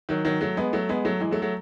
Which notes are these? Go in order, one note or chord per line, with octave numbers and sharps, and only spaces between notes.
D#3 F#3
D#3 F#3
F#3 A3
G#3 B3
F#3 A3
G#3 B3
F#3 A3
E3 G#3
F#3 A3
F#3 A3